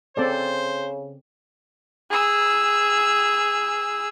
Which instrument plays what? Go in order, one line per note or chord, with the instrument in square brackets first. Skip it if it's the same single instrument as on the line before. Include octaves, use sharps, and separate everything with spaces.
[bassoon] C#3 [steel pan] C4 A4 D5 [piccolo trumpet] C5
[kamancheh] G#4 E6